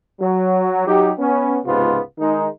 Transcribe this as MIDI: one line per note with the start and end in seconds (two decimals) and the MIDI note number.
0.20 0.84 54
0.86 1.10 54
0.86 1.10 63
0.86 1.10 67
1.19 1.58 59
1.19 1.58 61
1.66 1.98 37
1.66 1.98 44
1.66 1.98 48
1.66 1.98 59
1.66 1.98 65
2.19 2.47 51
2.19 2.47 56
2.19 2.47 63